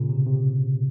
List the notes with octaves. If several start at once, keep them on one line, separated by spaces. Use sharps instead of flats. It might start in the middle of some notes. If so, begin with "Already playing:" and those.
Already playing: A#2 C#3
C3
C3